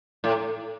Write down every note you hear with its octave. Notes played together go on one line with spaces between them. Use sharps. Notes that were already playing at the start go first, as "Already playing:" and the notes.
A2